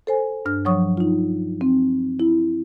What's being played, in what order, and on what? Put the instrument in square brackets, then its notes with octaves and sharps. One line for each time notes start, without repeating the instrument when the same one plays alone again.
[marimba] A4 C5 G#5
G2 D4 F6
F3 F#3 C#5 C#6 D#6
D#4 F4
C4
E4